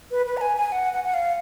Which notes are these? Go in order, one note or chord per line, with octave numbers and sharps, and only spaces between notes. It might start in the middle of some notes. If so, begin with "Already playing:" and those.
B4
B4
A#5
G#5
G#5
F#5
F#5
F#5
F5